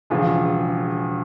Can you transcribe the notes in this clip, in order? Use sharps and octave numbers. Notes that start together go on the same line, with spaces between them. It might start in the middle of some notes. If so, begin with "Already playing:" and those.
E1 E2 C#3 F3 F4